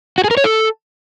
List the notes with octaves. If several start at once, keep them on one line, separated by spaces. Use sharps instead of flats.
F#4
G#4
A#4
C#5
A4